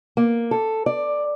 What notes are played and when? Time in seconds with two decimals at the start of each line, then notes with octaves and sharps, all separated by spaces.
0.17 A#3
0.51 A4
0.86 D5